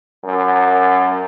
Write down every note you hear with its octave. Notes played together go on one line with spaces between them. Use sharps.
F#2